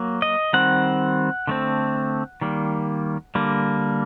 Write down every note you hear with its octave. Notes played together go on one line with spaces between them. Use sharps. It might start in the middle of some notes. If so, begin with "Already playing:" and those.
Already playing: F#3 A#3
D#5
D#3 G3 C4 F#5
D3 A3 C4
D#3 G3 A#3
D3 G3 A#3